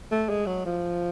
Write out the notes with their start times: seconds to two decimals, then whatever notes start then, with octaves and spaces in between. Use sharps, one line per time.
0.11 A3
0.29 G#3
0.46 F#3
0.65 F3